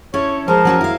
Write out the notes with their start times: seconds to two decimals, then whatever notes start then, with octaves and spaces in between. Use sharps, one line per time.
0.14 C#4 E4 A4 C#5
0.48 F3 G#3 A#4 C5
0.65 F#3 C#4 F#4
0.81 E4 F5